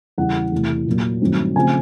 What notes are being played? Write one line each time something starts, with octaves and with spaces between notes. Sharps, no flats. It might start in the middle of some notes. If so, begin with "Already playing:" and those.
E2 C#3 E3 G3 F#5
E2 C3 E3 A3
A#2 F#3 A#3
G2 D#3 F#3 A3 C4
C#3 F3 A3 C4 G#5